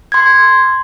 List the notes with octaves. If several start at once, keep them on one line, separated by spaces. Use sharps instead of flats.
C6 G#6